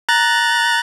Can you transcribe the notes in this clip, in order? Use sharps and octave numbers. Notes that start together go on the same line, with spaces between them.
A#5 F#6 A6